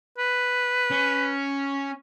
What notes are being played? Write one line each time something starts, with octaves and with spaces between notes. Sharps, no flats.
B4
C#4